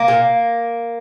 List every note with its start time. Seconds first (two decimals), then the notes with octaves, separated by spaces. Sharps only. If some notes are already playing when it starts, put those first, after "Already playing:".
Already playing: A#3
0.08 A#2